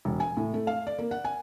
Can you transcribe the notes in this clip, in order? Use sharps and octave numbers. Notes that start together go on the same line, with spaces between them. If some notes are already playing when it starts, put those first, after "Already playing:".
E1
G#5
A2
A3
F5
D5
A#3
F#5
G#5